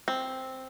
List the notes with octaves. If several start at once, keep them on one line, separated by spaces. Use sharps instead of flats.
C4